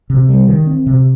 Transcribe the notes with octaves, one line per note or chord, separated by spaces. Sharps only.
C3
G3
D#3
C4
C3